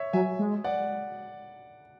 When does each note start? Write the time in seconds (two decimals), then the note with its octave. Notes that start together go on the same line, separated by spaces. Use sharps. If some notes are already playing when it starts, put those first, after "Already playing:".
Already playing: C#5 E5
0.13 F#3 E5 G#5
0.39 G#3
0.64 D5 F#5